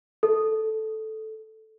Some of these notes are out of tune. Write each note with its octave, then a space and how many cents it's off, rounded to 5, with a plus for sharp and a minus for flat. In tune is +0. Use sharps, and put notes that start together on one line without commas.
A4 -5